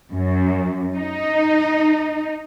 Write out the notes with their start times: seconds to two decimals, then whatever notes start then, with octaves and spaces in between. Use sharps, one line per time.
0.13 F#2
0.96 D#4